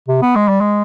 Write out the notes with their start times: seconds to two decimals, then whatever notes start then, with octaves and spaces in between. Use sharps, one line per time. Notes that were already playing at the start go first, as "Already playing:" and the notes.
0.08 C3
0.22 B3
0.36 G#3
0.48 G3
0.61 G#3